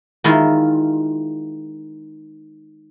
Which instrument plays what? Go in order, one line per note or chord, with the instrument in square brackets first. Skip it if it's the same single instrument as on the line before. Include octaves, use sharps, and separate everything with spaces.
[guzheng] D#3 G#3 E4 F4